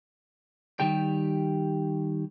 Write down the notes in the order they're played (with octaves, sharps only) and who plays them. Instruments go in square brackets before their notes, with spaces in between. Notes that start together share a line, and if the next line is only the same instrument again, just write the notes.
[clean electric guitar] D#3 G3 G4 G5